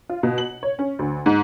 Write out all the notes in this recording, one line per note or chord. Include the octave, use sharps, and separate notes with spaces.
F4
B2
F#7
C#5
C#4
D2
G#2